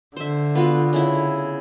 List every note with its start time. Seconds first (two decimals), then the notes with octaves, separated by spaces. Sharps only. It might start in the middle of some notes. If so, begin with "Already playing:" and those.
0.16 D3 C5 E5
0.55 B3 F4 F#4
0.93 C#3 E4